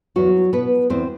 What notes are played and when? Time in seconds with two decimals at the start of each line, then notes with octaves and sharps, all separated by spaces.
0.16 E2 F#3 F#4
0.53 B2 B3 B4
0.90 E2 C4 C5